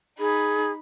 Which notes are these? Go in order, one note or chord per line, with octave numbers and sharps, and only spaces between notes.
D#4 G#4 B5